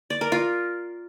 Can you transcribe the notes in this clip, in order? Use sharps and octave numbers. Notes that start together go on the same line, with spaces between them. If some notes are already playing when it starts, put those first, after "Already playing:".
D5
A#4
F4